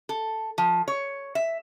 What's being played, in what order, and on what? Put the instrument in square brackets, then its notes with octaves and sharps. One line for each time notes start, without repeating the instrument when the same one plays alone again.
[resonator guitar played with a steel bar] A4
F3
C#5
E5